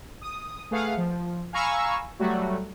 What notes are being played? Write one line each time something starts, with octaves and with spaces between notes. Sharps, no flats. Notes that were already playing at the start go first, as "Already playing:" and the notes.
D#6
A3 G#4 B4 F5 F#5
F3
F5 G#5 A#5 B5 C#6 E6
F#3 G3 A3 F#4